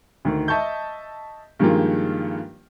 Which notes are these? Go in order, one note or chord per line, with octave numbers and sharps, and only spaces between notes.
D2 D#3
D#5 E5 A5 C#6 G6
G2 D#3 F3 G#3 A#3 F4